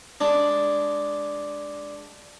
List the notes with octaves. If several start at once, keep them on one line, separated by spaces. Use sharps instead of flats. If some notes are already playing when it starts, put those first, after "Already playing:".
G#3 D4